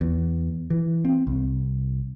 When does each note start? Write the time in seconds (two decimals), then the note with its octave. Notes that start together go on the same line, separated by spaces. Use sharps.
0.01 E2
0.70 E3
1.05 C4
1.27 C2